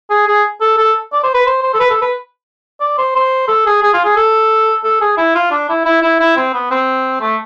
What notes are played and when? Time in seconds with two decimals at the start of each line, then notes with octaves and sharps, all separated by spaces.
0.10 G#4
0.27 G#4
0.61 A4
0.78 A4
1.12 D5
1.23 C5
1.34 B4
1.46 C5
1.62 C5
1.74 A4
1.80 B4
1.90 A4
2.01 B4
2.80 D5
2.98 C5
3.15 C5
3.48 A4
3.66 G#4
3.82 G#4
3.94 F4
4.04 G#4
4.16 A4
4.84 A4
5.01 G#4
5.17 E4
5.35 F4
5.51 D4
5.69 E4
5.85 E4
6.02 E4
6.20 E4
6.36 C4
6.53 B3
6.71 C4
7.21 A3